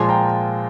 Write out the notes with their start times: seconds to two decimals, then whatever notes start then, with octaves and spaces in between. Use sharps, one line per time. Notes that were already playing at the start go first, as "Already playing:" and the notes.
Already playing: A#2 F3 G#3 G#5 C6
0.09 G5 A#5